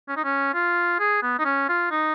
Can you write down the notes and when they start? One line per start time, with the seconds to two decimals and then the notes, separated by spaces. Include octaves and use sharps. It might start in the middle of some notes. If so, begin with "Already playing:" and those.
0.09 C#4
0.17 D#4
0.25 C#4
0.54 F4
0.99 G#4
1.23 B3
1.39 D#4
1.45 C#4
1.69 F4
1.91 D#4